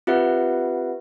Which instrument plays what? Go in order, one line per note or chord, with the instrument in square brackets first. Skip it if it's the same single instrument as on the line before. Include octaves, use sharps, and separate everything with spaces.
[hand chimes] C4 F4 G4 B4 E5 F#5